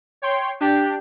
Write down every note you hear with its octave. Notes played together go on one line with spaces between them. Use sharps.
C#5 G5 C6
D4 G4